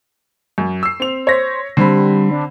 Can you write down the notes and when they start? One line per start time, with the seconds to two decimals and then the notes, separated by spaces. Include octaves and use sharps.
0.58 F#2
0.83 E6 C7
1.00 C4 F7
1.27 C5 C#5 A#6 B6
1.77 D3 G3 C4 B5
2.31 D4